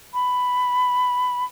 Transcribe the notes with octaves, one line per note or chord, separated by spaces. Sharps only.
B5